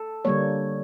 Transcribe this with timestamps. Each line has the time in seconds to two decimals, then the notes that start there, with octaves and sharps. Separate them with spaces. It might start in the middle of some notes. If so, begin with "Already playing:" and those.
Already playing: A4
0.25 D3 G3 A#3 C#5